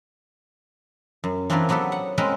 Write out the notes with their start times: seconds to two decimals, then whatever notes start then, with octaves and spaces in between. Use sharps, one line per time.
1.24 F#2
1.50 E3 C4 D4 F4 A#4 B4
1.69 F#3 B3 G4 A4 B4
1.92 F#5
2.18 G#3 C4 C#4 F#4 A#4 B4